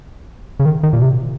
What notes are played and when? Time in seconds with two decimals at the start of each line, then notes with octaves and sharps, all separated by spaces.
0.60 C#3
0.66 D#3
0.83 D#3
0.93 A#2
1.01 C3